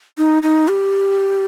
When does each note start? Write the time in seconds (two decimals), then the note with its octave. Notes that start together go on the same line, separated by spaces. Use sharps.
0.18 D#4
0.43 D#4
0.68 G4